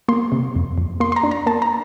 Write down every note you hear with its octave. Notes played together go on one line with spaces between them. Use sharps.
A#3 C6
C3
F2
F2
A#3 C6
C6
A#5
D4
A#5
A#3 A5
A#5